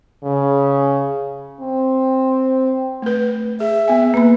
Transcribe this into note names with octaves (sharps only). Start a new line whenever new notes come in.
C#3
C4
A3 B4
G#4 E5
B3 G#5
A#3 B4 B5